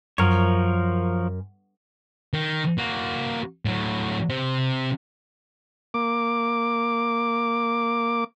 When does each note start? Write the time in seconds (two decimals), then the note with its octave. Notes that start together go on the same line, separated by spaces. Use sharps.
0.18 F#2 F3 A#4 C#5
2.33 D#3
2.78 A#3 F#4
3.65 A2 F#3
4.29 C3
5.94 A#3 D6